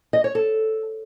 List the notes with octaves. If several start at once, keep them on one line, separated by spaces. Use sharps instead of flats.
D#5
C#5
A4